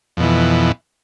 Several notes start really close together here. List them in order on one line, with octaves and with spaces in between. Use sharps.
F2 B2 E3